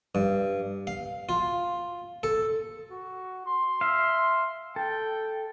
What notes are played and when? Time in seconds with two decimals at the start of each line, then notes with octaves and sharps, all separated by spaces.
0.15 G2
0.87 F5
1.29 F4
2.23 A4
2.91 F#4
3.46 C6
3.81 E5 F5
4.76 A4 G5